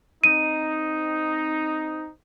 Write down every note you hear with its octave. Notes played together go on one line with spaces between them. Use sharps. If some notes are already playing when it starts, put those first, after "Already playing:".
C4 D#4 D#7